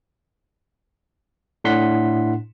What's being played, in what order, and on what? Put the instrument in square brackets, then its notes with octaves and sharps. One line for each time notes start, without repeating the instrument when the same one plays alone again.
[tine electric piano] A2 D4 F#5 C6 B6